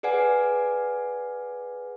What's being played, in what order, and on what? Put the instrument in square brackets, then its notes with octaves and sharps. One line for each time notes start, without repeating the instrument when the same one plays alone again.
[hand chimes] G#4 B4 D5 F#5 G#5